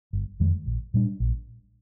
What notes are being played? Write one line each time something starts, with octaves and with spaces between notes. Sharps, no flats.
G1
F2 D#3 G#3
A#1
A#2 G3 D4
A#1